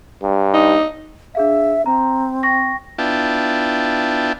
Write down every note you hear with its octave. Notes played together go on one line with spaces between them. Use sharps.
G2
D#4
D4 G#4 E5 F5
C4 A#5
G5 C#6 A#6
B3 D4 E4 F4 G5 A5